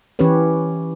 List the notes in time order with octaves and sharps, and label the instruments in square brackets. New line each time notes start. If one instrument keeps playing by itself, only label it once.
[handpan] E3 C#4 G4 B4 C#5